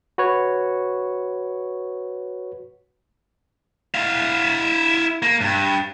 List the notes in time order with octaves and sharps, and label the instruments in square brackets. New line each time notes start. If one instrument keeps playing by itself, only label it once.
[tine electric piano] F#4 B4 C#5
[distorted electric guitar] E4 F5
A#3
G2